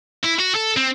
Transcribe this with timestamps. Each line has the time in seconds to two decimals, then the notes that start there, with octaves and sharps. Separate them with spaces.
0.24 E4
0.40 F#4
0.55 A4
0.77 C4